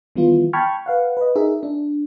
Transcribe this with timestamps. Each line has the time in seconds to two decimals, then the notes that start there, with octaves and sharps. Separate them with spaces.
0.16 D#3 E3 G3 B3 E4 F4
0.53 G5 A5 B5 C#6 F6 G#6
0.86 B4 F5 F#5
1.17 B4 D#5
1.36 D#4 G#4 A#4 E5
1.63 D4